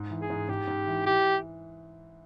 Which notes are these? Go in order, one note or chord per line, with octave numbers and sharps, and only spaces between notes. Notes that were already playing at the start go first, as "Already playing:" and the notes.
Already playing: G#2
E3
G#4
G#2
G#2 G4
G#2
E3
E3 G4